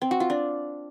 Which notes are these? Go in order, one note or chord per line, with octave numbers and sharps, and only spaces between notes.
C4
F#4
F4
D4